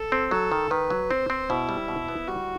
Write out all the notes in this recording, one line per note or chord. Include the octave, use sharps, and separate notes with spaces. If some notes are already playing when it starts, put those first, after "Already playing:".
Already playing: A4
C4
F#3 A4
D#3
D#3 B4
F#3
C4 C5
C4
B2 E4
G3
B2
B3
G3 F#4